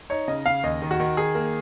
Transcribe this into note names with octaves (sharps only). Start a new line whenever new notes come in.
D#4 C#5
C#3 D#5
C#3 F5
D#2 D#5
D#3
F#4
D#3
D#3 G#4
A#3